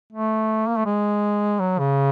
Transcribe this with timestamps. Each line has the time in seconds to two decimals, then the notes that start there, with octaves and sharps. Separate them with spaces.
0.13 A3
0.67 A#3
0.77 A3
0.86 G#3
1.60 F#3
1.79 C#3